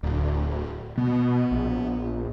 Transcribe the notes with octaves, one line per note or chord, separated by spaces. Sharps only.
D1 D2
B2 B3
A#1